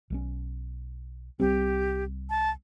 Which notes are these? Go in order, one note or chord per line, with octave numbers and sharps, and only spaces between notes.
B1 G3 C#4
C2 G3 C4 G4
A5